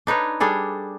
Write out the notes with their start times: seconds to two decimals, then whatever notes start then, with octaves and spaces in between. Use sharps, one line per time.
0.07 D4 D#4 B4 C#5
0.40 G3 D4 G#4 A4